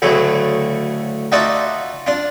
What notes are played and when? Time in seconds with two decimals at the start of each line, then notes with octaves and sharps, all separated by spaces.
0.02 D2 A2 C#3 F#3 A3
1.32 D#4 F4 F#4 D5 E5 A5
2.07 D4 F4